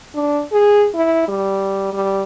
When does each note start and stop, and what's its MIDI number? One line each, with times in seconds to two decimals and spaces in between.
0.15 0.42 62
0.52 0.87 68
0.94 1.28 64
1.28 1.91 55
1.93 2.22 55